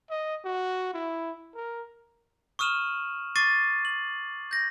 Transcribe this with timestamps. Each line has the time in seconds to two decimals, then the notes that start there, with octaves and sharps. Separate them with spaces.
0.10 D#5
0.45 F#4
0.93 E4
1.55 A#4
2.59 C#6 D#6 F6 D#7 E7 F#7
3.36 C#6 D6 A6 C7 D#7
3.85 F#7
4.51 G6 A#6